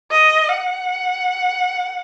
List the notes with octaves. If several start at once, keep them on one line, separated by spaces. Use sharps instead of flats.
D#5
F#5